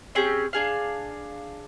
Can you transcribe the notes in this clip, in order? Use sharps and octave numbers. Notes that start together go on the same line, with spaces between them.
C4 C#4 G4 G#4
D4 G#4 F5